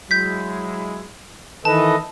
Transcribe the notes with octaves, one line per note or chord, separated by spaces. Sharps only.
F#3 G#3 E4 G6 B6
D#3 E3 A4 B4 D#5 A5